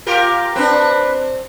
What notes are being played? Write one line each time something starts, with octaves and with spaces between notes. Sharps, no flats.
F4 G4 A#4
C4 D4 B4